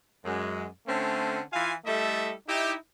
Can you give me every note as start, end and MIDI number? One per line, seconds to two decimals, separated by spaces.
0.25 0.65 42
0.25 0.65 56
0.87 1.40 50
0.87 1.40 57
0.87 1.40 60
0.87 1.40 61
1.53 1.73 52
1.53 1.73 65
1.53 1.73 77
1.53 1.73 80
1.86 2.33 55
1.86 2.33 57
1.86 2.33 64
1.86 2.33 69
1.86 2.33 75
1.86 2.33 76
2.48 2.74 63
2.48 2.74 64
2.48 2.74 67